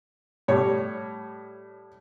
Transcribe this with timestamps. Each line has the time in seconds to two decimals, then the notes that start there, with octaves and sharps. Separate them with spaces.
0.48 A2 G3 C#5